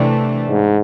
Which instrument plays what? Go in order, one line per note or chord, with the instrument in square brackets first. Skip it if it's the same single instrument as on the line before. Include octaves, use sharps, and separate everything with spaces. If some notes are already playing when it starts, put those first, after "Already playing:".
Already playing: [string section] C3 E3 A3 D4
[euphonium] G#2